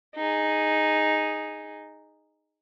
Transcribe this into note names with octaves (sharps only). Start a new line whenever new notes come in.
D#4 G#4